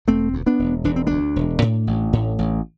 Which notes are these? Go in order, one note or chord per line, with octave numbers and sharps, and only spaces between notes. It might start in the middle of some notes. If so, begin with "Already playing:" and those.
E1 A3 C4
D2
B3 D4
E1
E1 D4
C4
D2 B3 D4
E1
A2
A1
A2
A1